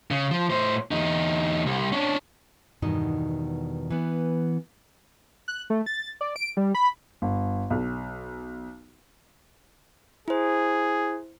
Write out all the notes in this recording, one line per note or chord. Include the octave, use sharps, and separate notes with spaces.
C#3
F3
A2 C5
E2 D#4
C2
C#4 D4
E2 G2 B2 D#3 D#4 D#5
E3 B3
F#6
A3
A6
D5
D7
G3
B5
G1
B1
E4 G#4 C5